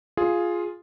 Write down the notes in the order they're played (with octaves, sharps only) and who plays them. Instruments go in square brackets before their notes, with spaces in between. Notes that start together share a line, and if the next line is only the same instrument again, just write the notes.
[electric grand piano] F4 G#4